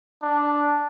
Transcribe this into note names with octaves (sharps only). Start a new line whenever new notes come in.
D4